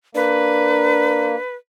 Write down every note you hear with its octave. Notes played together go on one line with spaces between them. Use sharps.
A#3 D4 B4